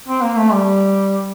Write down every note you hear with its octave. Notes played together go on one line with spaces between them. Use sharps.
C4
A#3
A3
G3